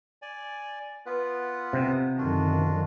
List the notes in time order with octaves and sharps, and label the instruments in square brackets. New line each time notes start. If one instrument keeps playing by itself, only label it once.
[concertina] D5 G#5
B3 F4 B4
[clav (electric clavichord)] C3
[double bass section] F#2 D3 D#3 [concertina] D4 F4 F#4